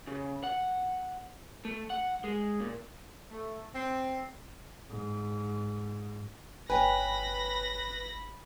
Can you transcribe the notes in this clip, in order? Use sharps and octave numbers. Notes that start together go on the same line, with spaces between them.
C#3
F#5
A3
F#5
G#3
A#2
A3
C4
G#2
G1 B4 C#5 G5 G#5 B5 A#6